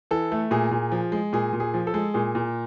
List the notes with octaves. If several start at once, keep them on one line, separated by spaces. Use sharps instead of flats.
E3 A4
A3
A#2 G#4
A#2
F3
G#3
A#2 G#4
A#2
G#4
F3
A4
G#3
A#2 G#4
A#2